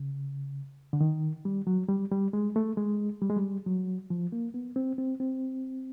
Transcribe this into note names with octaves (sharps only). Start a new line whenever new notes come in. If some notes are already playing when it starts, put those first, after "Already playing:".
Already playing: C#3
D3
D#3
G3
F#3
G3
G3
G#3
A3
G#3
G3
G#3
G3
F#3
F3
A#3
B3
C4
C4
C4